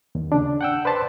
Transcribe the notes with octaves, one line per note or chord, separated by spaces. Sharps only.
D#2
C#3 D4
F#5 G5 E6
B4 C5 D5 A5 B5 C6